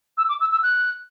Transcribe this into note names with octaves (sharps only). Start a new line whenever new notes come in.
E6
D6
E6
E6
F#6